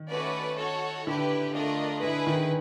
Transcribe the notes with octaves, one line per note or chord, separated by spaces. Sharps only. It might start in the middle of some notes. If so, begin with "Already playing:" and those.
Already playing: D#3
A3 C#4 F#4 B4 D5
F#4 A4 C#5
D3 E4 G4 B4
A3 D4 F4 A#4 D#5
D3 E4 G#4 B4
D#3